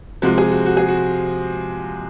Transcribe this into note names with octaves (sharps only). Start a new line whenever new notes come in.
C3 F3 G#3 F#4
G#4
F#4
F#4
G#4
F#4